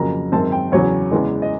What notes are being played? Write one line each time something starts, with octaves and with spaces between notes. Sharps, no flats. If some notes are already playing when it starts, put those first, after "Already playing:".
Already playing: F2 C#3 F#3 A#3 A#5
F#2 D#3 G#3 C4 A5
G5
E2 C#3 F#3 C#5
E2 C#3 E3 G#3
D#5